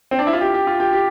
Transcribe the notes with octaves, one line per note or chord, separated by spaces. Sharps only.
C4
D4
E4
F4
G4
G4
F4
G4
G4